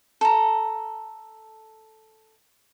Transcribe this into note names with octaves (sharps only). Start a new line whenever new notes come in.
A4 A#5